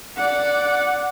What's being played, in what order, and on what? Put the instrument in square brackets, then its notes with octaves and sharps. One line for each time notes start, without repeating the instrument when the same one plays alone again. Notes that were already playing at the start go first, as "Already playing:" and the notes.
[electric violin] D5 F#5